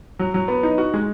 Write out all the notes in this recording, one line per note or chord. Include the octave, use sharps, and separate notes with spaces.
F#3
F#3
B3
D#4
F#4
G#3